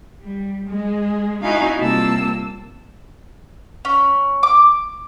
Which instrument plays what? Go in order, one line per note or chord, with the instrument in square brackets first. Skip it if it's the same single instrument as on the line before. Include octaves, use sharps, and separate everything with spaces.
[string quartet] G3
G#3 G#4
D#4 E4 F#4 F5 G#5
C3 G3 A#3 F4 A5 E6
[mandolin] C#4
D6